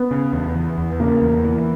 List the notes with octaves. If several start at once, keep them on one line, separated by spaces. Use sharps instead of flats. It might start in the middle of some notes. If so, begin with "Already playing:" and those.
Already playing: B3
C#3
E2
E3
E2
C#3 A#3
E2
E3